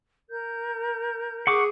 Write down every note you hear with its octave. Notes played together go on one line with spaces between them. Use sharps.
A#4 G6
G#4 F#5 C#6 D6